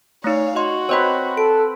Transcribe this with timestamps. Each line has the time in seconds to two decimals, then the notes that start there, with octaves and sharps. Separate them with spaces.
0.24 A3 D#4 C#5 F5
0.56 F#4 D#5 C6
0.89 C4 B4 C#5 D#5
1.37 A4 D7